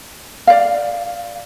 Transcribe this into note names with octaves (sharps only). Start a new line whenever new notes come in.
D5 F5